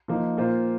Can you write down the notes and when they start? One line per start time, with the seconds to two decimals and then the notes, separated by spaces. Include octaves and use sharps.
0.08 F3 A#3 D#4
0.37 A#2 A#3 F4 C5